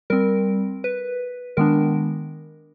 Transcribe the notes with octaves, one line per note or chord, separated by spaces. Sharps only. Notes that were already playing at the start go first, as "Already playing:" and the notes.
G3 C4 A#4
B4
D#3 G#3 B3 D4 A#4